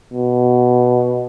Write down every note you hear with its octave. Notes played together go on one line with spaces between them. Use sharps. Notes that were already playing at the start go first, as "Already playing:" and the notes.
B2